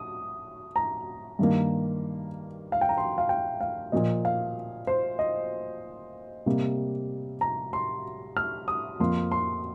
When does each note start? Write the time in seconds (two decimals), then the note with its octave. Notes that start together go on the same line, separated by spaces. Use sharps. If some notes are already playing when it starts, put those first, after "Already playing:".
Already playing: D#6
0.76 A#5
1.39 G2 D#3 A#3
2.72 F5
2.81 G5
2.89 A#5
2.98 C6
3.18 F5
3.29 G5
3.61 F5
3.92 A#2 F3 A#3 D#5
4.25 F5
4.87 C5
5.19 D#5
6.46 C3 G3 A#3
7.41 A#5
7.73 C6
8.37 F6
8.68 D#6
9.00 F2 F3 A#3 C6
9.32 C6